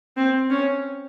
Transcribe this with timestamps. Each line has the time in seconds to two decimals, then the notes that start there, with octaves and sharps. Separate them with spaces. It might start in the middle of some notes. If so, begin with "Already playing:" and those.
0.17 C4
0.50 C#4